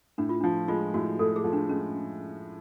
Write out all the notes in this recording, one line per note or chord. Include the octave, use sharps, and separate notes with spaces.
A2 D4
F4
F3 D4
G#3 F4
A2 F#4
A2 A4
G#4
F3
D4
G#3 C#4